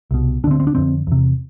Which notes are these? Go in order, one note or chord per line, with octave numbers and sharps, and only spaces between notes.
C2 B2
D2 D3 C4 D4
C4
D4
F2 D3 C4
E2 C3